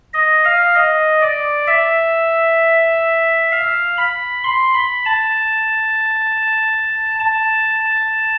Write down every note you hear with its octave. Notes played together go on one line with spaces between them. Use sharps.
D#5
F5
D#5
D5
E5
F5
B5
C6
B5
A5
A5